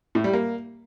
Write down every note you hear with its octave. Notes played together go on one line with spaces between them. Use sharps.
A2
G3
A#3